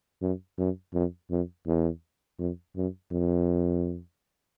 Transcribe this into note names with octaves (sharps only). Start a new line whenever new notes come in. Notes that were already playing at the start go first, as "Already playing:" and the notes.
F#2
F#2
F2
F2
E2
F2
F#2
F2